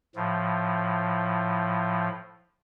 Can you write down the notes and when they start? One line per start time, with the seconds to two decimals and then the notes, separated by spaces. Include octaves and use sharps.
0.16 A2 F3